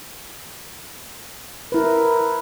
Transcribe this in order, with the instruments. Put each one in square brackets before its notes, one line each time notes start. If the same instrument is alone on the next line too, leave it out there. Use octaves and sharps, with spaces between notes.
[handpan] E4 B4 [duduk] A#4